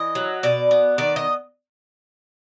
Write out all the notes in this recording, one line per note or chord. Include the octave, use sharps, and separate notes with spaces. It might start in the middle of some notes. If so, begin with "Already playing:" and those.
Already playing: E3 D#5
F#3
B2 D5
B3
D#3 D5
D#5